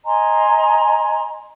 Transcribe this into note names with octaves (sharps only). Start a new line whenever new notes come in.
D#5 G#5 A#5 C6